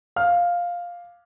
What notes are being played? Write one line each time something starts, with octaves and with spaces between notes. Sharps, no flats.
F5 F6